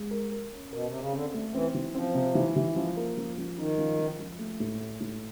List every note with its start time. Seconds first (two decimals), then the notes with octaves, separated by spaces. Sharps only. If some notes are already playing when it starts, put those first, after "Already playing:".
Already playing: G#3
0.11 A#4
0.31 A#4
0.52 C#4
0.73 B2 A#4
0.86 C3
0.93 C#4
1.00 C#3
1.13 D3 C4
1.34 A3
1.54 E3 C4
1.74 E3
1.95 F3 C4
2.15 C3
2.35 E3
2.56 E3
2.76 F3
2.97 A#3
3.17 F3
3.38 F3
3.58 D#3 D#4
3.78 F3
3.99 F3
4.20 F3
4.39 A3
4.60 A2
4.80 A3
5.00 A2